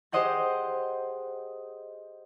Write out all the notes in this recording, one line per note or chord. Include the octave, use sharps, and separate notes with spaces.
G4 G#4 C5 D#5 F#5 G6